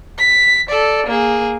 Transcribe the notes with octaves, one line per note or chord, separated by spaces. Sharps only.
B6
A4 D5
A#3 G#4